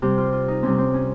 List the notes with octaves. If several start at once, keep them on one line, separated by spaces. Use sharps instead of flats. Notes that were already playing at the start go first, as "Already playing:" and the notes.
C3 G3 C4 G4
F4
F4
D#4
C3 G3 C4 C#4
C4
C#4